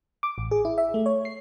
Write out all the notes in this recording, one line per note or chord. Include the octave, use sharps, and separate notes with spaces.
D6
A1
G#4
E4
E5
A3
C#5
C7